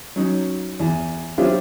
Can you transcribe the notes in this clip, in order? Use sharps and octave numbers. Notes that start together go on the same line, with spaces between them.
F#3 C#4 D#4
E2
F#3 C4 D4 E4 F4 G4